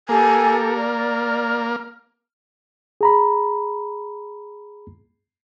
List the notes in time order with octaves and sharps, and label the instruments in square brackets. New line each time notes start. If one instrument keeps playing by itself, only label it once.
[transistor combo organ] A#3 [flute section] G4 A4 [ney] G#5
[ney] D5 [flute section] F6
[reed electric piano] G#4 A#5 B5